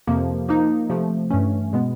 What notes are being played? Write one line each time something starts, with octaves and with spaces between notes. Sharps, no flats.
F2 C3 F3 A#3
F3 A#3 D#4
C3 F3 A3
G2 E3 A3 C#4
B2 G#3 B3